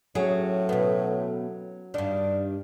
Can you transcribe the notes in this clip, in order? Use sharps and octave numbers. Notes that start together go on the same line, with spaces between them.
A2 F#3 C#4 G#4
B2 B3
G2 D#3 D4